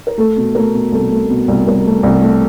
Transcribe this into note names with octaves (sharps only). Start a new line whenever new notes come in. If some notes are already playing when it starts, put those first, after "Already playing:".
A#4
A3 A4
B2
A3 A#4
B2
C2 A4
A3
B2
C2
C2 A#4
A3
C2
A3